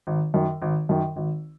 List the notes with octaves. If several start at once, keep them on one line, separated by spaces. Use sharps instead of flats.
G#1
F#2 D#3
G#1
F#2 D#3
G#1